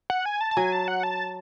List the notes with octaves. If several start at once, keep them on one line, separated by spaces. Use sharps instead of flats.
F#5
G#5
A5
A5
F#3 G#5
A5
F#5
A5